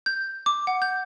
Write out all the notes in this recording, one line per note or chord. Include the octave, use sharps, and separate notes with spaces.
G6
D6
F#5
G6